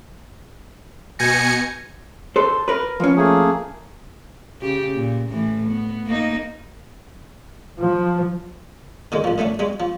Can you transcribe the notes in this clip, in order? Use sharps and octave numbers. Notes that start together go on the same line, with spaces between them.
B2 G#5 G6 G#6 A#6 C#7
A4 C5
A#4 B4
F3 C#4
A3 A#3 G#4
C#3 G4
A#2
A2 E3
B3
A#3 D#4
F3
D3 D#3 G#3
A1 F3
D3 A3 C#4 D4
G3 G#3
F3